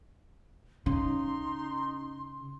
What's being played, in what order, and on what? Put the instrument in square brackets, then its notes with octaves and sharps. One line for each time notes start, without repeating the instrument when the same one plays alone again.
[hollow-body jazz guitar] C#3 [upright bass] C#4 [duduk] D#4 [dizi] C6